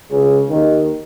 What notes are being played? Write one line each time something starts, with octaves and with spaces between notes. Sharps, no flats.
C#2 C#3
D#2 D#3